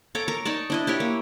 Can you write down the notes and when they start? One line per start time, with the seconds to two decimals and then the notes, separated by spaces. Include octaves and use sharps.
0.15 A4 C#5 A#5 D6
0.28 A#4 A#5
0.45 D#4 C#5 D5 A5
0.70 D4 E4 D#5
0.87 E4 G4 C#5
1.00 A#3